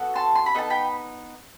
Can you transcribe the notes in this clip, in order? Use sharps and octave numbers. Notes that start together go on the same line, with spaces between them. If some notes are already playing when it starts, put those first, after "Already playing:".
Already playing: B3 F#4 A4
A5 C6
C6
B5
B3 D#4 A4 A5
G5 B5